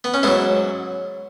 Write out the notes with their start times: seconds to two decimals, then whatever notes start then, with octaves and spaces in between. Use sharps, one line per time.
0.04 B3
0.14 C#4
0.23 G#2 F#3 B3 E4